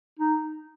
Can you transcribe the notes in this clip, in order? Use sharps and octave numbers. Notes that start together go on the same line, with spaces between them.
D#4